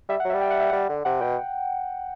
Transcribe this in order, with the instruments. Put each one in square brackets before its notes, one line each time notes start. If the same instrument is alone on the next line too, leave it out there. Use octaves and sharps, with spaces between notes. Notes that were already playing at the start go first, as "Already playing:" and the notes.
[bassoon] G3 [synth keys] E5
[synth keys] F#5
[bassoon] F#3
[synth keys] E5
[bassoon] G3
[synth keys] G5
F#5
E5
[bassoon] G3 [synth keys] F#5
[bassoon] D3
[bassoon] C3 [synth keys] F#5
[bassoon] B2 [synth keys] G5